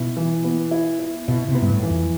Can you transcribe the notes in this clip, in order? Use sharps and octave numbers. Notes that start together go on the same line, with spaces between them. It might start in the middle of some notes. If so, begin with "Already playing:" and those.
Already playing: B2 E4
E3
B3
E4
E4
B2 E4
C3
B3
G2
A2
E3
F2